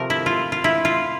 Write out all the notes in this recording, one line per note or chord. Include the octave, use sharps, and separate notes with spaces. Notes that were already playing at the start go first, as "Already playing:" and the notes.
Already playing: C3 F3 A3 A#4
E4
F4
F4
E4
F4